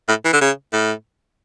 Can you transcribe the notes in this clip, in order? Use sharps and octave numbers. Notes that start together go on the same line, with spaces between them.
A2
E3
D3
C#3
A2